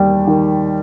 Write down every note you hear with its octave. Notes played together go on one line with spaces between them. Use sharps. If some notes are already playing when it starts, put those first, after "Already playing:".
Already playing: D#2 G3
D#3